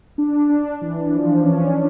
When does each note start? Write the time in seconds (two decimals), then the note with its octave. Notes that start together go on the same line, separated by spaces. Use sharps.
0.18 D4
0.49 D4
0.81 E3
1.13 F3
1.44 C#4